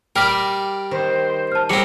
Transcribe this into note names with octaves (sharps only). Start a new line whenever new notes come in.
G3 A#4 D5 G5 F6 B6
D#3 C5
A5 F6
F#3 G3 C4 G#4 A#4 C#7